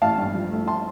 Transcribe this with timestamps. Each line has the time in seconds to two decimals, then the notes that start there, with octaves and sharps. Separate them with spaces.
0.02 A1 F5 A5
0.18 G2
0.35 F3
0.52 A3
0.67 A5 C6